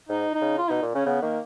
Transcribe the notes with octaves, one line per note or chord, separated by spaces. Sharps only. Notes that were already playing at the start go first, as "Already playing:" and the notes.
G#2 D#4
D#4
C#3
F4
B2 D#4
A#2
C#3 C#4
C#3 B3
D#3 A#3